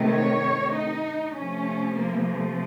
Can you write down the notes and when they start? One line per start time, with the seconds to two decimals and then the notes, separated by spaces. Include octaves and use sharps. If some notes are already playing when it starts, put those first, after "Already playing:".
Already playing: C3 D#3 A3
0.10 C#5
0.72 D#4
1.34 C3 F3 A3 C#4
1.97 A#3
2.29 A3